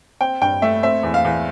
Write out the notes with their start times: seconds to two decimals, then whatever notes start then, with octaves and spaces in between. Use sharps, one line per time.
0.21 C4 G5
0.41 G2 G5
0.62 A3 E5
0.83 C4 E5
1.03 E2
1.14 F5
1.25 E2